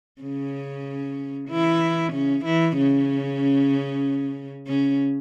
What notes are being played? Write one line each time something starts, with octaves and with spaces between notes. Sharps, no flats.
C#3 C#4
E3 E4
C#3 C#4
E3 E4
C#3 C#4
C#3 C#4